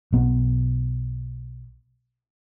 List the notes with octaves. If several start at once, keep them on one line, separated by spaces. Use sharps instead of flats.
B1 B3